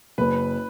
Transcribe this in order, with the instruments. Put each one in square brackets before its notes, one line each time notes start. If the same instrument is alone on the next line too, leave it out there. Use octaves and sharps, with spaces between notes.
[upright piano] F#1 [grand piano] B4